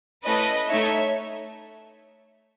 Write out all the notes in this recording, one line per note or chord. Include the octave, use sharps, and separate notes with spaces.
A3 C#4 E4 A4 B4 D#5
A3 D#4 A4 C#5 E5